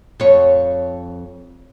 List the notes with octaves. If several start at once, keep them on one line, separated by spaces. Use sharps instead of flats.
F2 C#5